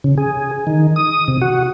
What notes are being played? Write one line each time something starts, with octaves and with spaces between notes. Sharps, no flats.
C#3
G#4
D#3
D#6
C3
F#4